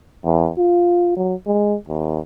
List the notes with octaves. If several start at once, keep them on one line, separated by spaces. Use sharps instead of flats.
E2
F4
F#3
G#3
D#2